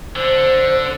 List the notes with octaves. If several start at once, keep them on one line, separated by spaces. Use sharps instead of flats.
D3 C5